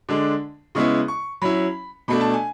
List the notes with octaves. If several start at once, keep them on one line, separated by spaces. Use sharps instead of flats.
D3 G#3 D4
C#3 G#3 B3 E4 C#6
C#6
F#3 C#4 E4 B5
B2 A3 D4 B5
A5
G#5